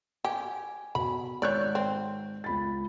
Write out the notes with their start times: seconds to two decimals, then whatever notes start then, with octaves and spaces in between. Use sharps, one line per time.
0.25 G4 G#5
0.95 B2 B5
1.42 G#1 C#5 D5 F#6 G6
1.75 C4
2.44 C#2 B5 A6